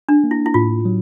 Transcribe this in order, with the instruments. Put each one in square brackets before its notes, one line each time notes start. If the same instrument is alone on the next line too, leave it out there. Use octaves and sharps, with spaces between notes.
[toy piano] D4
[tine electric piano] A#3
[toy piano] E4
E4
[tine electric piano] A2 [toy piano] F4
[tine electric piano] F#3